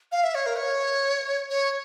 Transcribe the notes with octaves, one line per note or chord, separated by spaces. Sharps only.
F5
E5
C#5
A#4
C#5
C#5